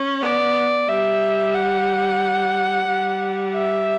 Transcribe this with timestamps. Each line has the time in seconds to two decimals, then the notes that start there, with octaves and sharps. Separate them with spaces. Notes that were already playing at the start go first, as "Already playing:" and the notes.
Already playing: C#4
0.22 B3 D5
0.89 G3 E5
1.55 F#5
2.87 G3
3.53 E5